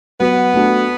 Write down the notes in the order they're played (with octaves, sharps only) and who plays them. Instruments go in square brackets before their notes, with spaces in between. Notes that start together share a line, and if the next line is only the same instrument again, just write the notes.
[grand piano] F#3 [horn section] B3
[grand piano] A3 D4 F#4